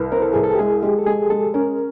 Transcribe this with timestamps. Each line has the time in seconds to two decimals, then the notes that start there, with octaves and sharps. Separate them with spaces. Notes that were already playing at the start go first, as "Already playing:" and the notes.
Already playing: C2 B4
0.12 C4 A#4
0.22 A4
0.34 C2 G#4
0.44 A4
0.55 G4
0.59 G#3 G#4
0.82 G#3 G4
0.99 A4
1.06 G#3 G#4
1.30 G#3 A4
1.54 C#4 A#4